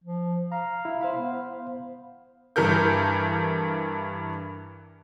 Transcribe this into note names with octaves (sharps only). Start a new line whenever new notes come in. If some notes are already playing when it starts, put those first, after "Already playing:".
F3
F5 A#5
E4
C5 F5 B5
B3
G2 E3 A4 A#4 G6